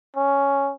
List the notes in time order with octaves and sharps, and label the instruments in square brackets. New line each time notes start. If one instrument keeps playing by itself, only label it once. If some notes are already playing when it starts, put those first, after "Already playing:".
[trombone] C#4